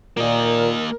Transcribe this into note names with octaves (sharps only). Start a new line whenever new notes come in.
A#2 A#3 A#4 D#5